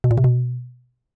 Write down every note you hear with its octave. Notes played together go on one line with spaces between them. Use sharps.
B2
A#2
C3
B2